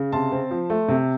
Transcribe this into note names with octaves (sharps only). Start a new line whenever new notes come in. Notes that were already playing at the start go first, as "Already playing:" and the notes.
Already playing: C#3
C3 A5 C6
C4
F3
A3
C3